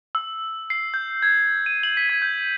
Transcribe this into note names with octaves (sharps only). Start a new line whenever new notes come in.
E6
C7
G6
G#6
D#7
F#7
B6
G#6
G6